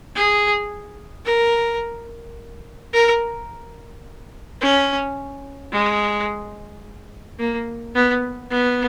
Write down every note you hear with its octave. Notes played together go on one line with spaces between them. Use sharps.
G#4
A#4
A#4
C#4
G#3
A#3
B3
B3